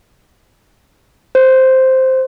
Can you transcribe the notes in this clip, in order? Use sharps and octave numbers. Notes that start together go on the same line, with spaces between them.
C5